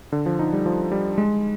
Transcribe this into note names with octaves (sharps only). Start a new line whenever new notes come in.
D3
F3
D#4
G3
F3
G3
G#3